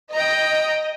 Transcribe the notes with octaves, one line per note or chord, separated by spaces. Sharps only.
D#5 G5 A#5